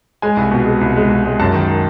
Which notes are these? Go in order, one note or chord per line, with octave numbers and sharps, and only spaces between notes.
G#3 G#5
C2
B2
G#3
C2
G#3
C2
G#3
F#2 A5
D#3